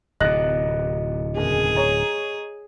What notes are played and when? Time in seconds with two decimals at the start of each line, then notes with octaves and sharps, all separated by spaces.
0.20 D1 C3 D#5 F#6 A#6 F#7
1.37 F#1 E2 G#4
1.76 C#5 A#5